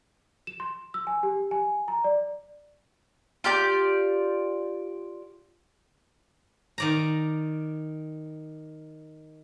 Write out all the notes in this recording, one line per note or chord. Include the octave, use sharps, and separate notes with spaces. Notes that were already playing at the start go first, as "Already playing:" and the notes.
E7
C6
E6
G#5
G4
G#5
A#5
D5
F4 G4 D5 G6
D#3 D5 A#5